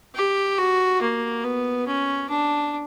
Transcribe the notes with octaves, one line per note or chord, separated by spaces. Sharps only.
G4
F#4
A#3
B3
C#4
D4